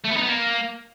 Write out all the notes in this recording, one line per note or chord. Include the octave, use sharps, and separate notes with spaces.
A3
B3
D#4
B3
A#3